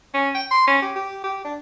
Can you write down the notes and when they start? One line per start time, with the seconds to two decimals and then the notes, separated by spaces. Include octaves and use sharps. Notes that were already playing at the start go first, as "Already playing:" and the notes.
0.14 C#4
0.35 G5
0.51 C6
0.68 C#4
0.82 G4
0.96 G4
1.24 G4
1.45 D4